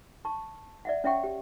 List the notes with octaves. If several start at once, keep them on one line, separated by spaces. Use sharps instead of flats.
A5 C#6
D5 E5 F#5
C#4 C#5 E5 F#5 G5 C#6
G4